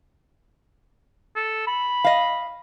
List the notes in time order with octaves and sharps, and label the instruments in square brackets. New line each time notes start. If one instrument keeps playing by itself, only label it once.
[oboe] A4
B5
[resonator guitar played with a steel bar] D#5 F5